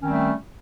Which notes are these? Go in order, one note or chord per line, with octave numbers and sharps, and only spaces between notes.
D#3 G3 A3 C4 C#4